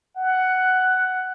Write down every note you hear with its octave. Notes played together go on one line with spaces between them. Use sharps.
F#5